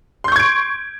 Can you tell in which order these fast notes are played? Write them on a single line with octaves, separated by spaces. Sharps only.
C6 G6 C#6 G#6 D7